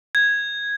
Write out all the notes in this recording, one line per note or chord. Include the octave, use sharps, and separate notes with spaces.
G#6